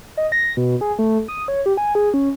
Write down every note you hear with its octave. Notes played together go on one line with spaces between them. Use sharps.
D#5
A#6
B2
G#4
A3
D#6
C#5
G4
G#5
G#4
C#4